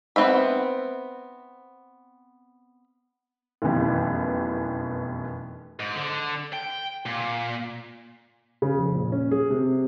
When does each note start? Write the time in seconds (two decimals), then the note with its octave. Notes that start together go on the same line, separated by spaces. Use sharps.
0.16 B3 C4 E5 B5
3.62 F1 F#2 B2 E3 G4
5.80 G#2
5.96 D3
6.53 G5
7.06 A#2
8.62 C#3
8.77 F2
8.95 A#2
9.12 C#4
9.31 G#4
9.50 C3